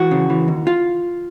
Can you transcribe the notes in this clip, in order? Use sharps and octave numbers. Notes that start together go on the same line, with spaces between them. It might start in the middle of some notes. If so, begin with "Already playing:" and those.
Already playing: E3 F#4
C#3
E3
D#2
F4